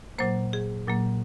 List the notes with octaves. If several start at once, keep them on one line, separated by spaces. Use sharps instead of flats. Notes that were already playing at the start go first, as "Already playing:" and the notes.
A#2 F#3 A#3 C5
G#4
A#2 F#3 A#3